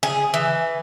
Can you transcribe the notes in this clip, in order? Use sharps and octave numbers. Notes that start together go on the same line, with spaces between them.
G#4
E3